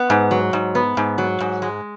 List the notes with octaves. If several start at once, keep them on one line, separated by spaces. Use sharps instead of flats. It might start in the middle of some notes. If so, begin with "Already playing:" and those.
Already playing: B3
G#2
F#3
G#2
B3
G#2
F#3
G#2
G#3